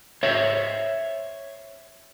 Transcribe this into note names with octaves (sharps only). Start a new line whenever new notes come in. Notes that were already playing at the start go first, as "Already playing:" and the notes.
C5 C#5 E5